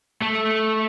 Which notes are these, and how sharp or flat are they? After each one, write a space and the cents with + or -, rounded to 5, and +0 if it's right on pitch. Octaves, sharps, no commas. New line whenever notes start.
A3 -10